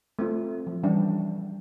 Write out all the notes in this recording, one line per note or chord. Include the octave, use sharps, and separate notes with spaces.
A3 C4 F4
F3
E3 G3 C#4 D4